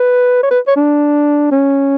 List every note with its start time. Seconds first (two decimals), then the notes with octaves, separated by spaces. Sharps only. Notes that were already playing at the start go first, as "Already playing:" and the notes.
Already playing: B4
0.43 C#5
0.51 B4
0.67 C#5
0.76 D4
1.51 C#4